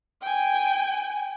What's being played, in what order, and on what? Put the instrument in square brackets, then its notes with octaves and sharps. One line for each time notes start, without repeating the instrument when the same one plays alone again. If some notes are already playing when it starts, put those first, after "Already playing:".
[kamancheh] G5 G#5